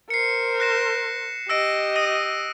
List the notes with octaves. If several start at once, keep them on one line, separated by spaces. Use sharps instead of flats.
A#4 C5 C7 C#7
F#6 A#6 E7
G4 D#5 E6 A#6 D7
D#6 A#6 D#7